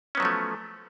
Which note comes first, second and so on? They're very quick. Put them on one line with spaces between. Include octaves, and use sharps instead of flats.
C#4 B3 F#3 F3 A3